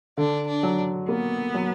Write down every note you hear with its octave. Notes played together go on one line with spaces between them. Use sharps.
D3 D4
D4
F#3
A#3 B3
F#3